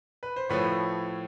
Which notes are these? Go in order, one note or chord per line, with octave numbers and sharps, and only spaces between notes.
B4
C5
A2 F3 A3 B4 C#5